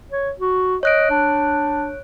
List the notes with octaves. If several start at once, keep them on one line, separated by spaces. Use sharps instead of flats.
C#5
F#4
C#5 D#5 F#6 D7
D4